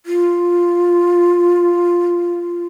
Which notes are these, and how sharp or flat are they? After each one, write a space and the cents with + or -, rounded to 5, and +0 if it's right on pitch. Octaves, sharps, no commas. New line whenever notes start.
F4 +0